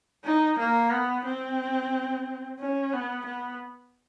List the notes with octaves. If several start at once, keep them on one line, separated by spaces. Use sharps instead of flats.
D#4
A#3
B3
C4
C#4
B3
B3